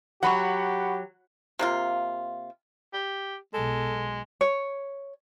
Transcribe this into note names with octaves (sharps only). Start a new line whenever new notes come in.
F#3 G4 F#5 B5 C#6
C3 A#3 F4
G4
B1 B2 G#3 A4
C#5